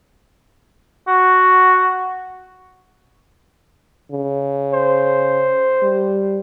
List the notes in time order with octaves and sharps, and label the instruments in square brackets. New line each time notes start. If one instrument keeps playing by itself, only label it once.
[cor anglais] F#4
[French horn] C#3
[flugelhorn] C5
[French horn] G3